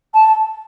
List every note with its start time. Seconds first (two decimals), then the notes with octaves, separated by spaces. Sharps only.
0.14 A5